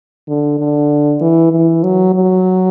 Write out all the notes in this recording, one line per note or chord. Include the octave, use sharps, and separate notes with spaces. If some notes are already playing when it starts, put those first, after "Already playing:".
D3
D3
E3
E3
F#3
F#3